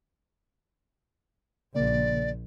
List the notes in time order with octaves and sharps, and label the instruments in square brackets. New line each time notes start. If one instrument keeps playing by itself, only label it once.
[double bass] A#1 [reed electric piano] C#3 A#3 [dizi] D5